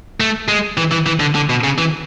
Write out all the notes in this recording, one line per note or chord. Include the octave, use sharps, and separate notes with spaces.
A3
G#3
E3
E3
E3
D3
D3
B2
C#3
E3